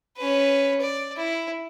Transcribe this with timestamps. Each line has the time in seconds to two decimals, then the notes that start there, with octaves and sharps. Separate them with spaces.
0.17 C#4 B4
0.81 D5
1.16 E4